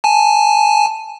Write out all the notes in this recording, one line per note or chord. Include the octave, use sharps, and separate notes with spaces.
G#5 A5